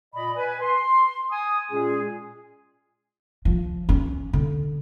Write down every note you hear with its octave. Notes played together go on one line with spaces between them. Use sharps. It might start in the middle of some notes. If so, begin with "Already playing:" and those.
A#2 D5 D#5 B5
B4 G#5
C6
G#5 D#6
A#2 G#3 C#4 F4 G#4
F3
C#4
D3